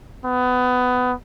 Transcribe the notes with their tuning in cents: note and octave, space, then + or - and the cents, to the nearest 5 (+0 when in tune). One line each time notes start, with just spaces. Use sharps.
B3 +20